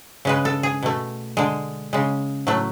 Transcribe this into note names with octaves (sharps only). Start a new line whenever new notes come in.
C#3 G#3 B4
A4
G#4
B2 A3
D3 G#3
C#3 G#3
A2 F#3 A3